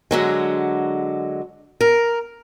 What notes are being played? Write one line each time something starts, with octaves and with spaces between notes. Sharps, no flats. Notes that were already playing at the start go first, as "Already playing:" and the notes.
D3 F#3 G#3
A#4